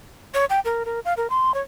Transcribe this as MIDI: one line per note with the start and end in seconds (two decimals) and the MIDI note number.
0.34 0.45 73
0.50 0.60 79
0.65 0.83 70
0.85 1.00 70
1.05 1.14 77
1.17 1.27 70
1.30 1.54 84
1.54 1.61 73